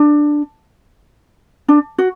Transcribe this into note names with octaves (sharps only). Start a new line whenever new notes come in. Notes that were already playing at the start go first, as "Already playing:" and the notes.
Already playing: D4
D4
F#4